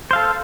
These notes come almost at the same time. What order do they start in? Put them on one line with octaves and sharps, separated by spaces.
C5 F5 A4